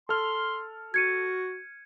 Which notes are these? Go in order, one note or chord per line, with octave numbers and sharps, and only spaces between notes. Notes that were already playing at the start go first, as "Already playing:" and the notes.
A4 C6 F6
F#4 G#6 C#7 D#7